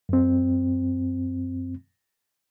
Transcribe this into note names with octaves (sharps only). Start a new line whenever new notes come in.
F#2 C4